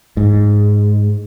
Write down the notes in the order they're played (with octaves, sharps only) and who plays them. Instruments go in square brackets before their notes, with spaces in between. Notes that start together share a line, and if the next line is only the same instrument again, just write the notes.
[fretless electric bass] G#2